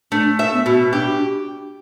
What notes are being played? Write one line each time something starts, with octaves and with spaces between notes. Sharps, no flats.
A3 D4
E5
B3
B2
D4 G4